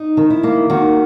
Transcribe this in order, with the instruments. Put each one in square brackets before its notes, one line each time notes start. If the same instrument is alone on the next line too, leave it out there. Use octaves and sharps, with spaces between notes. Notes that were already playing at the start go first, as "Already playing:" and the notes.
Already playing: [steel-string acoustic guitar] D#4
D#3
E4
A#3
D#3 F#4